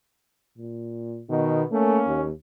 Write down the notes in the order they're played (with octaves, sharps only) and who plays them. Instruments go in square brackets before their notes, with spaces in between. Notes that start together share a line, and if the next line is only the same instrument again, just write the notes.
[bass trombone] A#2
[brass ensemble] B2 [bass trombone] D#3
[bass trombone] A3 [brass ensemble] A#3 C#4
[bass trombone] D#2